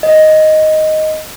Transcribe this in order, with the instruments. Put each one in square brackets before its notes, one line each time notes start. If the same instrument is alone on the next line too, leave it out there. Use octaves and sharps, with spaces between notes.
[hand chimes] D#5